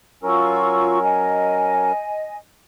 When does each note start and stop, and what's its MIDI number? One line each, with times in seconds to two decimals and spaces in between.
0.23 1.92 54
0.23 1.92 61
0.23 1.02 65
0.23 1.92 70
0.23 1.02 85
0.23 1.02 88
1.03 2.37 75
1.03 2.37 80